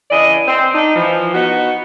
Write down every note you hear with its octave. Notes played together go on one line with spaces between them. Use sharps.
C#3 E3 D4 G#4 D5 D#5
C4
D4 D#4
E3 F3
B3 D#4 F#4